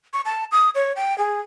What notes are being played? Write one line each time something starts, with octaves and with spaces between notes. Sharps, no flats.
C#6
A5
D#6
C#5
G5
G#4